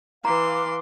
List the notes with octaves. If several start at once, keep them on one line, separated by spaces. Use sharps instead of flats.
E3 F5 A#5 C6 D6